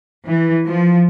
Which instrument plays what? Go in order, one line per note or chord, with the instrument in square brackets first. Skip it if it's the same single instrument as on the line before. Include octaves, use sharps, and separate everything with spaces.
[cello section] E3
F3